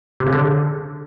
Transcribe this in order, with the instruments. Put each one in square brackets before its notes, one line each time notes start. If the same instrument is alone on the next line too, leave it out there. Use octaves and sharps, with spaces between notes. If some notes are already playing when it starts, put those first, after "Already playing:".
[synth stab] C3
C#3
D3